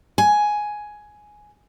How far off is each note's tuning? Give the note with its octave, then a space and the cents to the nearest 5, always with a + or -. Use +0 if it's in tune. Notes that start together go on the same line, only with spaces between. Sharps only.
G#5 +10